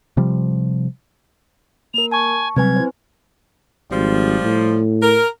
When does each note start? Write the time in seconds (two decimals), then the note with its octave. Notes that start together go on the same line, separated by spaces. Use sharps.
0.17 C3 F3 G3
1.94 A#3 A#4 F7
2.11 G#5 A5 C#6
2.56 C3 F#3 G3 C4 B4 G#5 G#6
2.76 E4 C5
3.91 G#1 F3 G3
4.42 A2
5.02 A#4